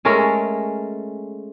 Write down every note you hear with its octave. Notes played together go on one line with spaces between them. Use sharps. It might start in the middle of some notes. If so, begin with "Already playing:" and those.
G#3 A3 C#4 A#4